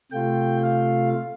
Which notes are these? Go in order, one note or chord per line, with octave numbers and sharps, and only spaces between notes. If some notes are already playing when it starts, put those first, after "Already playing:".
C3 A3 F4 G5
F5